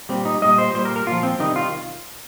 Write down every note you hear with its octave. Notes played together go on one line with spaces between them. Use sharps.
A#2 G3 C4
D#4
A#2 G3 D#5
C5
A#2 G3 C5
A#4
A#4
A#2 F3 F4
C4
C3 D#3 G3 D#4
F4